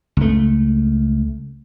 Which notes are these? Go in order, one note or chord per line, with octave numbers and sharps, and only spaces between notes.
C#2 A3